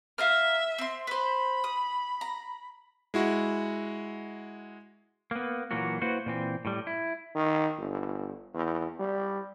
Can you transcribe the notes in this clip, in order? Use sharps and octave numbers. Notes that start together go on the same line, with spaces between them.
E5 F5 A#5 F6
C4 C6
B4 C5 B5
D#6
A#5
G#3 E4 F#4
A#3 B3
A#2 E3 F#3 A#3 F#4
A#3 E4 F#4 B4 C5
A#2 E3 C4
A2 G3
E4
D#3
G1
E2
G3